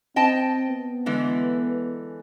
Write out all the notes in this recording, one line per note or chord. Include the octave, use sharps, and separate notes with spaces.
C4 D#5 G5 A5
B3
D3 E3 G#3